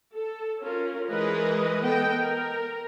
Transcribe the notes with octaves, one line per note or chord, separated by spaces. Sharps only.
A4
C#4 F4 A#4
E3 G#3 G#4 A#4 B4 D#5
B3 A4 D#5 G5
A#4